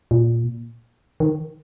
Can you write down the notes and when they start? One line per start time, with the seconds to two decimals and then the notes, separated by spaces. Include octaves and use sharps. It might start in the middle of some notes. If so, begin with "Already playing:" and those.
0.11 A#2
1.20 D#3